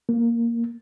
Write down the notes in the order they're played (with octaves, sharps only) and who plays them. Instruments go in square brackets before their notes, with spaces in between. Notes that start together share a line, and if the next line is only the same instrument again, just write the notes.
[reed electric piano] A#3